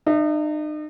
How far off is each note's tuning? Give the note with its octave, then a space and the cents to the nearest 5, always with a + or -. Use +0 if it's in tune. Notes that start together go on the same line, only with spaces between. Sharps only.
D#4 -40 E5 +0